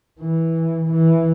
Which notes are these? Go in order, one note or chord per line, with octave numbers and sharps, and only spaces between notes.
E3
E3